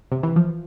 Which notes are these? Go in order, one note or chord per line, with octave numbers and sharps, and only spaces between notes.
C3
E3
F3